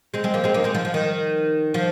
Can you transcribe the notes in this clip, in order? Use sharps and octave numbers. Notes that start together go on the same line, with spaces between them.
G#3 C4
G#3 C4
F3 A#3
G#3 C4
A#3 D#4
G#3 C4
F3
F3
D#3
F3